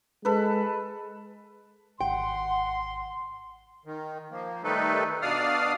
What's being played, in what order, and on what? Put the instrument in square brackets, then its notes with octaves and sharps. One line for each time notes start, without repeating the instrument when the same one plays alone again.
[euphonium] G#3 [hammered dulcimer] A4 B4
[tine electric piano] G#1 [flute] F#5 [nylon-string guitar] G5 [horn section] C6
[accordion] D#3
F3 A#3
D#3 G3 A3 D#4 A4 B4
B2 D4 D5 F5 D#6 F6